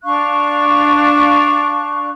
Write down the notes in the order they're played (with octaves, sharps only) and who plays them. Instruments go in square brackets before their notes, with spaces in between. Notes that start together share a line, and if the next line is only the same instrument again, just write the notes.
[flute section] D4 F5 C#6 F#6